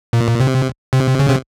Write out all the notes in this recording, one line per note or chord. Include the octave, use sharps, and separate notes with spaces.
A#2
C3
C3
C#3
C3